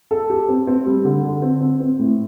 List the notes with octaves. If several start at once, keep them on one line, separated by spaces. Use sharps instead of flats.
A4
G4
C4
C4
G3
D3
D3
C4
C4
C4
A2